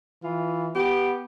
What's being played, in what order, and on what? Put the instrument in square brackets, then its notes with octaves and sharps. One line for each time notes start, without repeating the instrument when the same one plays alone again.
[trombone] E3 [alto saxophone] F4
[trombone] B3 [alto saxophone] G4